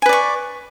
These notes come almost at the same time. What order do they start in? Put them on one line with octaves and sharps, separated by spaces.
G#5 B4 D5 C#6